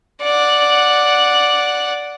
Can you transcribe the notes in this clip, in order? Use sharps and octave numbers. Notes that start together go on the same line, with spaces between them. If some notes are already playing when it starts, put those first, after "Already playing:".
D5 F#5